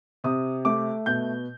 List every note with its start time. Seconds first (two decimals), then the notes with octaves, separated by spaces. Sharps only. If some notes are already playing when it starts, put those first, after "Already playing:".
0.24 C3 D#6
0.65 A3 D6
1.06 B2 G6